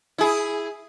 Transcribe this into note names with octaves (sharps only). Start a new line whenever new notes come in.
E4 G#4